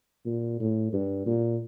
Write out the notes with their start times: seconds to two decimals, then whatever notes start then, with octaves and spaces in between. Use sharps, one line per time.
0.26 A#2
0.60 A2
0.93 G2
1.26 A#2